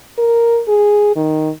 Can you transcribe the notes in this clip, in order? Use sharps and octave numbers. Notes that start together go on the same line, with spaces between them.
A#4
G#4
D#3